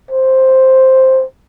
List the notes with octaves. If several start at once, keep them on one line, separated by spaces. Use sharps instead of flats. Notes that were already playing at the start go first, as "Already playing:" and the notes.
C5